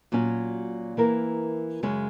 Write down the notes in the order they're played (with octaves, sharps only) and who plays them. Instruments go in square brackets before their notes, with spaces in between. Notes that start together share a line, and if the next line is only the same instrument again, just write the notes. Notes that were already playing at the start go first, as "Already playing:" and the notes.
[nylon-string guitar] A#2 F#3 C#4 F#4
E3 A#3 E4 A#4
F#2 C#3 G#3 C#4